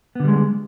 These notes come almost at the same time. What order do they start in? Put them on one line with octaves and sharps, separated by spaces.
B3 D3 G3 G#3